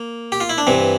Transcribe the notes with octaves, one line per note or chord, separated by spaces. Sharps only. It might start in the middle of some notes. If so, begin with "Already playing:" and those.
Already playing: A#3
G4
F4
E4
D4
G2 E3 C4